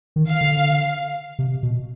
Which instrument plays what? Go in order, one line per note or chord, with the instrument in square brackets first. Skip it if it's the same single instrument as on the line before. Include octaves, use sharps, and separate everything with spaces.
[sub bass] D#3
[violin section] F5
[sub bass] D3
C3
B2